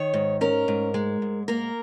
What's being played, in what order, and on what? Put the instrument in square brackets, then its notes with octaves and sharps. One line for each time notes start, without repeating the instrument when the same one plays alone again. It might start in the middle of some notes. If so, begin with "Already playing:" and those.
Already playing: [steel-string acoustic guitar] D#3 C#5
G#2
C#4 A#4
G#2
G#3
G#2
A#3 A#4